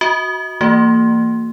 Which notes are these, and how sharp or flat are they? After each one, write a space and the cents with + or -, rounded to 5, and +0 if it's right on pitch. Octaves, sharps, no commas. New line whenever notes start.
F#4 +0 D#5 +45 D#6 -10
E3 +0 A#3 -35 F#4 +0